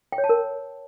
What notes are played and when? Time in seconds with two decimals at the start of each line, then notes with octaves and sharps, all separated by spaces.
0.12 G5
0.18 C#5
0.24 A5
0.29 A#4